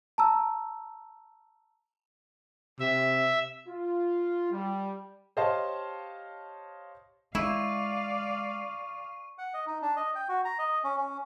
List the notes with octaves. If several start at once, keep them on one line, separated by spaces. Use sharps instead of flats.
A5 A#5 E6
C3 E5
F4
G3
G4 C5 C#5 D#5 F5 A5
G#3 E4 D5 F5 C#6 D#7
F#5
D#5
D#4
D4
D#5
G5
F#4
A#5
D#5
C#4
C#4